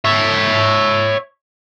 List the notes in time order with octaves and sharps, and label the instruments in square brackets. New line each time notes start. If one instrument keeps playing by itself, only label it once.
[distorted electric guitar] C#5 E5